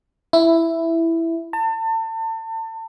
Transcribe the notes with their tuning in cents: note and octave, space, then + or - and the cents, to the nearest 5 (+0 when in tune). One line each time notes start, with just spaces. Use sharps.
E4 +5
A5 +35